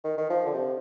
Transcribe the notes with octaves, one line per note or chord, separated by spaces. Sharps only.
D#3
D#3
F3
D3
C3